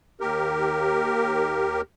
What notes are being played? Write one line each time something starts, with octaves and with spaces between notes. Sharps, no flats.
D#2 G4 A#4